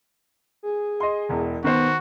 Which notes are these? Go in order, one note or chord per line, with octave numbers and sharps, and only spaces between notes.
G#4
D#5 C6
E1 E2
D#3 B3 F#4 C5